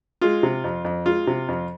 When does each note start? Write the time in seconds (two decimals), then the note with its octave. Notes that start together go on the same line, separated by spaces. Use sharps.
0.21 G#3 F4
0.43 C3
0.64 F2
0.85 F2
1.06 G#3 F4
1.27 C3
1.48 F2